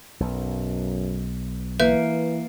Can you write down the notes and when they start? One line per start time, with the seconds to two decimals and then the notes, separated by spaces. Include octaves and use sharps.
0.20 B1 F#2
1.80 E3 A#3 B4 E5 G6